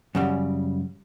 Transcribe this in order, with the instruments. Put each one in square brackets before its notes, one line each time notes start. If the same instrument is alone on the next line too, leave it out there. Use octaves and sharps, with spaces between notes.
[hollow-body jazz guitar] F#2 C#3 G3